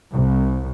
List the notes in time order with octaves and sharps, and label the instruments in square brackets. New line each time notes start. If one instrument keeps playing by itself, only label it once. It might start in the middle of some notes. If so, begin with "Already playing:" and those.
[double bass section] C2